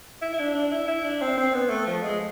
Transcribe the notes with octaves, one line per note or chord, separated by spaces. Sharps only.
E4
E4
D4
D4
E4
E4
D4
C4
C4
B3
A3
F3
G#3